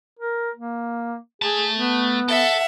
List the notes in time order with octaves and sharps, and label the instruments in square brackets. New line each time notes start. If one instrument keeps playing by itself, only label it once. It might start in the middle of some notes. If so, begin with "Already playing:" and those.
[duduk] A#4
A#3
[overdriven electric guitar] A3 A5 [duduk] G#4
[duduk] B3
[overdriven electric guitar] A4 [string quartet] E5 F#5